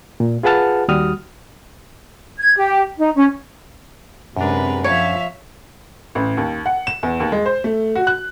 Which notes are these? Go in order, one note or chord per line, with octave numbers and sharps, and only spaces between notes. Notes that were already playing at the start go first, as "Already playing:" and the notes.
A#2
F4 G#4 B4 F#5 A5 F6
D#2 G3 F#4 D#6 F6
G#6
G4
D#4
C#4
F#2 C3 G#3 D4 A#4 B4
F3 C#5 E5 F5
A1
D#2
F#5
E7
E2
D#2
G#3
C5
A3
F#4
F#6